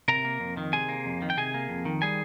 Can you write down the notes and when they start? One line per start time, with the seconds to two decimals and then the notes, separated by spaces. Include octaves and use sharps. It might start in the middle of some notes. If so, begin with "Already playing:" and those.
0.08 C3 A#4 A#5
0.25 A#3
0.40 F2
0.57 D#3
0.73 C3 G#4 G#5
0.89 A#3
1.06 F2
1.22 D#3
1.30 G5
1.37 C3 G#4 G#5
1.54 A#3
1.69 F2
1.85 D#3
2.02 G3 G#4 G#5